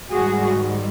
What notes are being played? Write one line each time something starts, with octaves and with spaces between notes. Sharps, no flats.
G#2 D#3 G3 F#4 G#4